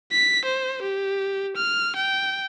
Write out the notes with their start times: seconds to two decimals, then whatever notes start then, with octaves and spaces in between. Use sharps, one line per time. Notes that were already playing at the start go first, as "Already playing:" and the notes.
0.12 B6
0.45 C5
0.82 G4
1.56 F6
1.96 G5